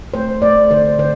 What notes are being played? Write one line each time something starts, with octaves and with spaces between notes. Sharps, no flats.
A3 C5
A3 D5
D3 C5
D3 C5